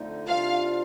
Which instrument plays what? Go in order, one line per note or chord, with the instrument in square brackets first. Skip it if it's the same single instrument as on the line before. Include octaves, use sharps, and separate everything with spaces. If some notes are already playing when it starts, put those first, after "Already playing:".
Already playing: [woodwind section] F2 D3 A3 D#4
[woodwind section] C2 C3 G3 D4 F4 [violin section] F5